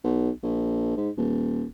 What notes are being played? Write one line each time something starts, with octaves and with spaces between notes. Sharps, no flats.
B1
A#1
G#2
D#1